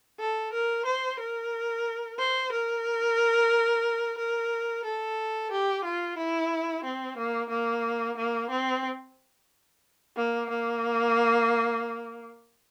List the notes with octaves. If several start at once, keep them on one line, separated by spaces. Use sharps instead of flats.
A4
A#4
C5
A#4
C5
A#4
A#4
A4
G4
F4
E4
C4
A#3
A#3
A#3
C4
A#3
A#3